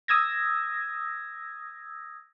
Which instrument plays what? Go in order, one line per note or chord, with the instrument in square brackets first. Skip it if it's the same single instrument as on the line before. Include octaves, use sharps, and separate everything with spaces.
[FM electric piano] D#6 E6 G#6 A#6